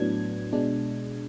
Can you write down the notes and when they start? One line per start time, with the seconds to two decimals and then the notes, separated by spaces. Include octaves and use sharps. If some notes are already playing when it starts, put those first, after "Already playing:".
Already playing: A2 F#3 B3 D4 G#6
0.53 B2 G#3 D4